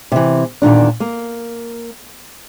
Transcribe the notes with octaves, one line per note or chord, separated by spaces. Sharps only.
C3 E3
E2 A#2 D#3 D4
A#3